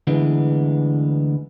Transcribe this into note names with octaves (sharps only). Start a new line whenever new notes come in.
D2 D3 E3 G#3 B3